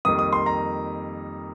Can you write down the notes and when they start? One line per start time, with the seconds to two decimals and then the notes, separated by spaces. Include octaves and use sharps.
0.05 F2 D#3 G3 A#3 D#6
0.19 D#6
0.33 C6
0.46 A#5